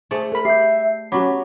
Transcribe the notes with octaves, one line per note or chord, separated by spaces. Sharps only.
A3 G#4 C5 D5 C#6
A4 A#4 B5
G4 E5 G6 C7
F#3 B3 C#4 F#4 G4 B5 C#6 D6